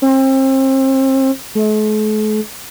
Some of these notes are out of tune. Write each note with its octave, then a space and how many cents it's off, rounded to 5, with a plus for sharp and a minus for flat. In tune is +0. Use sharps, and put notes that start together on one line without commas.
C4 +35
A3 -45